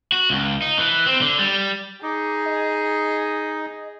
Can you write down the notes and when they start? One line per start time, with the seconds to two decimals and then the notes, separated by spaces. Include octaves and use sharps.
0.12 F#4
0.30 C#2
0.62 D#4
0.79 E3
1.06 C4
1.21 D3
1.39 G3
2.03 D#4 G#4 D6
2.46 D#5